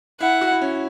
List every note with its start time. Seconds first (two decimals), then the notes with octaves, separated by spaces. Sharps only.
0.20 E4 F#5
0.41 F#4
0.51 E4
0.61 C#4